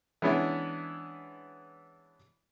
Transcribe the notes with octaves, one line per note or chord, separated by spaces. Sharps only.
E3 G#3 B3 C#4 D4 E4